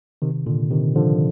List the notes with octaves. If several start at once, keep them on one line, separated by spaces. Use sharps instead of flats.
C3 D#3
A#2 D3
C3 D#3
D3 F3